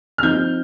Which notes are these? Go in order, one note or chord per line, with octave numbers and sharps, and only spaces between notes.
F6
F3 C4 D#4 G6